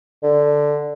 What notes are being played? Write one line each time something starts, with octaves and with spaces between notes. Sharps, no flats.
D3